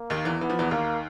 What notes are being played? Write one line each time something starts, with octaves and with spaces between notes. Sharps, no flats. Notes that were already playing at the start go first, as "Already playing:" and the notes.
Already playing: A#3
D#2 D#3
E2 E3
E3 B3
F3
E2 E3
D#2 D#3 A#3